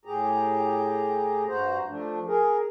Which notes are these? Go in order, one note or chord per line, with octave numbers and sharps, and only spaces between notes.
A2 G4 G#4 A#5
G2 F#4 C5 A#5
F3 A3 D4
G#4 A#4